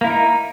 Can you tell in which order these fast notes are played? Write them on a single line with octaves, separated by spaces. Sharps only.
A#3 E4 A#4 D#4